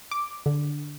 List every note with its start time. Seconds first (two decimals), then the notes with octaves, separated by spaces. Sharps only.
0.11 D6
0.46 D3